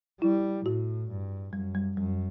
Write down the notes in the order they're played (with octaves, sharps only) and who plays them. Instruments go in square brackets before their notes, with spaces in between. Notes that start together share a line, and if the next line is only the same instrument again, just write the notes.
[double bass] G3 [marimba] E4
[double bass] A2 [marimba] F#4
[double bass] G2
[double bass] F#2 [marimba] G3
[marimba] G3
[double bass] F#2 [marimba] G3